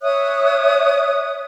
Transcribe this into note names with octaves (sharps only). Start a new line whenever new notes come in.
C#5 E5 D#6 F#6